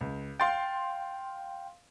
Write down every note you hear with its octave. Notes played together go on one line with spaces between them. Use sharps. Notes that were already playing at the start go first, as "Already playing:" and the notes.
C#2
F5 G5 C6 A6